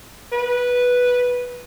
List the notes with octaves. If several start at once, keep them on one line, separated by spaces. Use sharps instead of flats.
B4